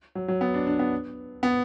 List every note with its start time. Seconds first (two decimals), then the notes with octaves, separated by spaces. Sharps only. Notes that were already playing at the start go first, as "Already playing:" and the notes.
0.15 F#3
0.28 F#3
0.41 B3
0.54 D4
0.67 D4
0.79 B3
1.43 B3